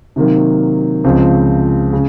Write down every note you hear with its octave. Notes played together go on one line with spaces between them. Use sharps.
C3 D#3 F#3 A#3
C#2 C#3 F3 C4
C#3